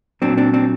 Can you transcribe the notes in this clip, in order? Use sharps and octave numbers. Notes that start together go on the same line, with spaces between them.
A#2 F#3 C4 D4
C4 D4
C4 D4